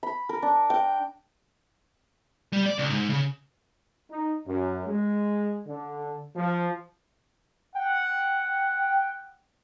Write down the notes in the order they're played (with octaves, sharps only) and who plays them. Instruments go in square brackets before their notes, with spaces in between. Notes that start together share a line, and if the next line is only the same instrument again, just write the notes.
[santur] B5
A#4
D4
G5
[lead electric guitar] G3
D5
C#2
G#2
C#3
[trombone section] D#4
F#2
G#3
D3
F3
[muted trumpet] F#5 [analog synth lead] G5